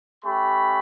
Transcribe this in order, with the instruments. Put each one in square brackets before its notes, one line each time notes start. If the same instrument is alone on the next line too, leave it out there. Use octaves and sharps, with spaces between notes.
[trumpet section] A3 C#4 G4 B5